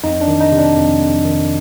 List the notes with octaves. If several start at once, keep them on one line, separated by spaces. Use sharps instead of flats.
F2 D#4
D4
D#3
D#4
C3
D4
F2
F2
D#3